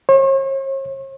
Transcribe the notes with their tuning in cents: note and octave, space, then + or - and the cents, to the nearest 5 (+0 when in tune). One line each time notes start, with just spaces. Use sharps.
C#5 -45